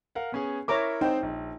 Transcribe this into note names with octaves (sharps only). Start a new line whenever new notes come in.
A#4 F5 F#5
B3 C#4 G#4
E4 A#4 C#5 E5 A#5 D6
C4 D#4 C5 G5
A#1